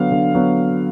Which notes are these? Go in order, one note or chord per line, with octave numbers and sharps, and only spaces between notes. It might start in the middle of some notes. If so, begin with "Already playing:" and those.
Already playing: D3 F#3 B3 F5
D3
F#3 B3